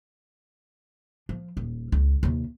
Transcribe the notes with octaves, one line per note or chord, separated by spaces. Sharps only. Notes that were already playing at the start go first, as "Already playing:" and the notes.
F3
D#1
C#2
D#2 C3